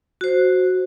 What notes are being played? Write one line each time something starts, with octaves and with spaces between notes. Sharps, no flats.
F#4 C5